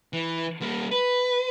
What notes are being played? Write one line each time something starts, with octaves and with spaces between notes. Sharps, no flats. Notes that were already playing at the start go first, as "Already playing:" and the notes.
E3
G3 A#3
B4